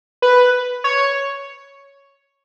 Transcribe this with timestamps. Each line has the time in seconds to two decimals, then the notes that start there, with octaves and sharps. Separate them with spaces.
0.22 B4
0.84 C#5